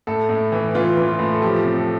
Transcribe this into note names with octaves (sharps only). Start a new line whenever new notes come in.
A2 A4
A2
E3
E3 F4
E3
F4
A2
A4
F3 G4
C3
A4